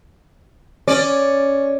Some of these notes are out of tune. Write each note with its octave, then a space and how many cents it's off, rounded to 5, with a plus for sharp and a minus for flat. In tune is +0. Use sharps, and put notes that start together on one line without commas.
C#4 +0 D5 +0